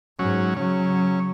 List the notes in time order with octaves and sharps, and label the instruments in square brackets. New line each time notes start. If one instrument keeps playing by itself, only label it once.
[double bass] G#2 G#3 [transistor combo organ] F#3 C#4
[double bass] C#3 F#3 [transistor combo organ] C#4